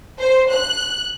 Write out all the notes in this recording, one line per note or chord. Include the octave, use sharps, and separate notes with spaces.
C5
F#6